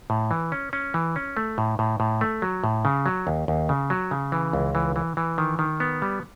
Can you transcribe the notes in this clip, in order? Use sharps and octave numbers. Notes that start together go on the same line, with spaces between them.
A2
E3
C#4
C#4
E3
C#4
A3
A2
A2
A2
A3
F#3
A2
C#3
F#3
D#2
D#2
C#3
F#3
C#3
E3
C#2
E3
E3
E3
D#3
D#3
B3
G3